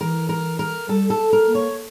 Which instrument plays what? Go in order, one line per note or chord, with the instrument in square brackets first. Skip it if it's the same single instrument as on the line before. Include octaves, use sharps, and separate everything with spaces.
[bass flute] E3 [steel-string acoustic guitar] A#4
[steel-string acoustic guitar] A#4
A#4
[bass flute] G3 [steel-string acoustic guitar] A4
[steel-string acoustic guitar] A4
A#4
[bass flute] A#3
[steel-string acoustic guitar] C#5